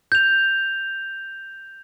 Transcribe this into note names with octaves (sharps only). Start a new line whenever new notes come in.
G6 F7